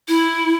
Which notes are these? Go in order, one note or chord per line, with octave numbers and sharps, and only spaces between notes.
E4